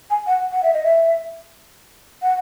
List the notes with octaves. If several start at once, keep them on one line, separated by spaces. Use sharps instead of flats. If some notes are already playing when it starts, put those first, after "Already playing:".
G#5
F#5
F#5
E5
D#5
E5
F#5